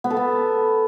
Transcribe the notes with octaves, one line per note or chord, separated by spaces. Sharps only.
B3
A4
B3